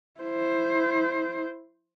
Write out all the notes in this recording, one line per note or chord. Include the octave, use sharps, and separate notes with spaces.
E4 C5